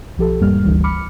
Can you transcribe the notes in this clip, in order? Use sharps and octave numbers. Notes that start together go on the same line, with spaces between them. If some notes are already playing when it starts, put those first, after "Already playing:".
B1 F3 G4 A4
E2 G#2 G3 A#3 F6
G1 D2 E3 G3
B5 D6 F6 C#7